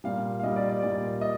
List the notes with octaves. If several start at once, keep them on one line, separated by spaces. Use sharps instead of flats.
A#2 G3 F5
F5
A#2 G3 D#5
D5
D5
A#2 G3 D5
D#5